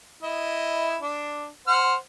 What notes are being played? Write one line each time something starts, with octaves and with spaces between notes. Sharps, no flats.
E4 D#5
D4
C5 F#5 F6